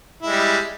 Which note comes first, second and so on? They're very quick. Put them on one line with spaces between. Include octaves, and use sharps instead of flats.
E4 G#3 G3